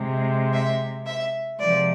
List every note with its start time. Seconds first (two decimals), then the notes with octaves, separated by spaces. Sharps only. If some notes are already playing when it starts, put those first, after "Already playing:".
Already playing: C3 G#3
0.53 E5
1.06 E5
1.58 C3 F3 G#3 D5